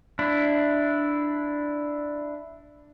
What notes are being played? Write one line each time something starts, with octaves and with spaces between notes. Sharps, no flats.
D4 E4